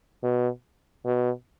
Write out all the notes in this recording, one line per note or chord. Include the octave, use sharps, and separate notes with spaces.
B2
B2